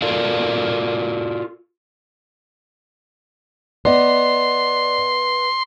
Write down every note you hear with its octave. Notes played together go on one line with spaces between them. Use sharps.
F4 F#4 A4 A#4 D5 F5
B3 D5 D#5 C6